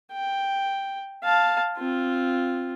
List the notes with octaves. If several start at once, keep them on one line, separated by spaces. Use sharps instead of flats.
G5
F5 A5
C4 F4